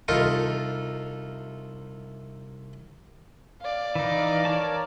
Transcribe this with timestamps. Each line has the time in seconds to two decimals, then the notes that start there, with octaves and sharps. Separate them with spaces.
0.08 C2 D#4 F4 A4
3.62 D5 F5
3.95 E3 D#4
4.45 A#4 C#5 A5